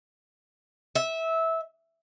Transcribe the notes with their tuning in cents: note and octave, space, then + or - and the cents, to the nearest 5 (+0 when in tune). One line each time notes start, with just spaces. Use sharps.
E5 -15